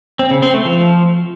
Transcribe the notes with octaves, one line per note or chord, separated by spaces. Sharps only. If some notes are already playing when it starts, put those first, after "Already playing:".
C4
C#3
C4
A3
F3